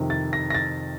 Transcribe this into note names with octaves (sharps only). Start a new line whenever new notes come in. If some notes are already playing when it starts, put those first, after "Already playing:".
Already playing: F2 C3 D#3
A6
A#6
A#6
A6